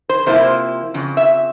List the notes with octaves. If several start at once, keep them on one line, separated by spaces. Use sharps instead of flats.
C5
C3 F3 A#3 E4 C5
F2 C#3
E5